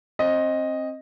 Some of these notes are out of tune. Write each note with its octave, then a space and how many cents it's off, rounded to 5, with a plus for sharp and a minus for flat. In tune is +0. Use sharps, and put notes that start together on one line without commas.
C4 +25 D#5 +0